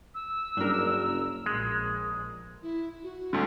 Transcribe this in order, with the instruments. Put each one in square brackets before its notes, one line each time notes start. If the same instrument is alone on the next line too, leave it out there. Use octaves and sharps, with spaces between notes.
[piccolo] E6
[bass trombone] F#1 [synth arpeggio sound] G2 [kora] D4 A#4
[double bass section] A#1 A#2 [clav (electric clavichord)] G#3
[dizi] E4
F#4
[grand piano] D2 D3